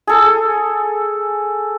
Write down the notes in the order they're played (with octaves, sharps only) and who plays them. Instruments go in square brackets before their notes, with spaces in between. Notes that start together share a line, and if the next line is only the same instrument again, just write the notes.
[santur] G#4 A4